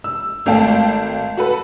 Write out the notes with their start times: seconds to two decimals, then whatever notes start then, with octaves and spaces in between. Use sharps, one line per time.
0.04 E6
0.46 G#1 A3 F5 G5 A5
1.37 F#4 A4 B4